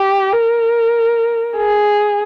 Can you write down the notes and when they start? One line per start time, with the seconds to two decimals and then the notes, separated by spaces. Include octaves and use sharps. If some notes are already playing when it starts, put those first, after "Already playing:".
Already playing: G4
0.32 A#4
1.57 G#4